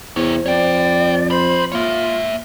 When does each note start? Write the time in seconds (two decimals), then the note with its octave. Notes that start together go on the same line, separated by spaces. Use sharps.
0.16 E2 C3 C5 C#5
0.46 F2 C#5 D5 G5
1.30 A#2 C5 B5
1.72 A#3 F4 C#5 E5